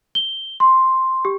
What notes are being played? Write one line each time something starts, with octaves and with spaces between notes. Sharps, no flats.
G7
C6
G4